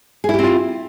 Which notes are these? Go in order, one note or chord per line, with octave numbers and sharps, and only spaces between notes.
C4 E4 F4 G4 G#4